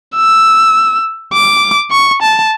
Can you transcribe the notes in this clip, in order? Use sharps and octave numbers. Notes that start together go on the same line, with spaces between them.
E6
D6
C#6
A5